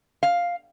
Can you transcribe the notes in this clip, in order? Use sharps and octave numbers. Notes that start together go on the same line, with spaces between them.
F5